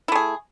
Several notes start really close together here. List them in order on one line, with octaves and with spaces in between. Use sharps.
E4 A3 G#4